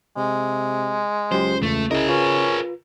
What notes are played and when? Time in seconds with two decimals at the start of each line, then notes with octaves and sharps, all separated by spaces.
0.17 C3 G#3
1.32 C#2 F#3 G4 C5
1.62 E2 C#3 A3
1.91 C2 C#3 E4 G#4 A#4 D#5
2.09 C#4 F4 B4